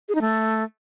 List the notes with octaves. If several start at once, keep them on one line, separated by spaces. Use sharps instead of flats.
G#4
D#4
A3